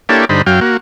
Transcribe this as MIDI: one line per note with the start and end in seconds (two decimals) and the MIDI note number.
0.09 0.25 58
0.09 0.25 62
0.09 0.25 64
0.09 0.25 67
0.09 0.25 69
0.09 0.25 73
0.29 0.42 43
0.29 0.42 50
0.29 0.42 63
0.29 0.42 72
0.29 0.42 83
0.46 0.60 42
0.46 0.60 54
0.46 0.60 77
0.46 0.60 79
0.61 0.77 58
0.61 0.77 66